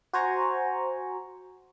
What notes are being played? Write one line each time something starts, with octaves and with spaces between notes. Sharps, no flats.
F#4 C5 G#5 A#5 C#6